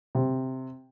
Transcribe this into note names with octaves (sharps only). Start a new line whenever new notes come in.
C3